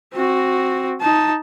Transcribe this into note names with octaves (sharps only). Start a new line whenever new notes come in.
C4 F#4
D#4 A5